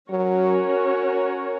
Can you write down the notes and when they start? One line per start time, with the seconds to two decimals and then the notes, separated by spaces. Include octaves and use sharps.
0.10 F#3 C#4 F#4 A#4 C#5